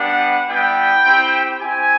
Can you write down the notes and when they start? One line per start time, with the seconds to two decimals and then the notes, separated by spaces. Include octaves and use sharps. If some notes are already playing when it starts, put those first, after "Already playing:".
Already playing: G3 B3 D4 G4 F#5
0.47 G3 B3 E4 G5
1.03 C4 E4 G4
1.58 C4 E4 G4 G#5